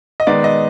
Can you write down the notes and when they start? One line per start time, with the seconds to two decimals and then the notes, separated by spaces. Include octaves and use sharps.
0.20 D#5
0.27 D#3 G#3 B3 D#4 D5
0.44 D#5